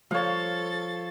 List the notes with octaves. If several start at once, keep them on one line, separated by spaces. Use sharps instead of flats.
F3 A4 C#5 F5 A6